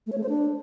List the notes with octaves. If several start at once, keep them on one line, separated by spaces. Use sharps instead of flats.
A3
C#5
A3
C5
D4